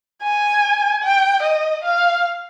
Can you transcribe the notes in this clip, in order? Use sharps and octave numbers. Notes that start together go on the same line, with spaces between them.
G#5
G5
D#5
F5